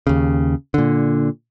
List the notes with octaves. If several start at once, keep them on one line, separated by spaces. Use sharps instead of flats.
D#2 C#3
A#2 D3